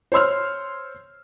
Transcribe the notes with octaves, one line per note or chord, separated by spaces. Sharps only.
C5 C#5 C6 E6 F6